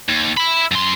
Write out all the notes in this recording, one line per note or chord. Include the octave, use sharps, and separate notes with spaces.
D#2
E5 B5
F#2 C6